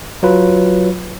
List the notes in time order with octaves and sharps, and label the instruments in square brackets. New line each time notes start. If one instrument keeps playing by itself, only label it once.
[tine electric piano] F#3 F4 B4